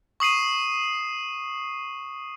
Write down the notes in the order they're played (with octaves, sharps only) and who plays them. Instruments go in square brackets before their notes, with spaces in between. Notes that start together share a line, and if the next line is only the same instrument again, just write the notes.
[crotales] C#6 D#6 C7 D#7